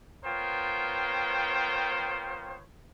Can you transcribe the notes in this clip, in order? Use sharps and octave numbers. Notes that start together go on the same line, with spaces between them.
B3 F4 A#4 C5 C#5 G5